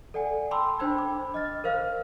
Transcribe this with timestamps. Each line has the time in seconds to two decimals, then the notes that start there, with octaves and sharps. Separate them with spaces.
0.14 A4 D5 F#5 G#5
0.51 G5 A5 B5 C6 D6 E6
0.79 D4 C5 G5 B5 E6 G#6
0.98 D6
1.34 D#5 F6 A6
1.64 A#4 C5 F5 F6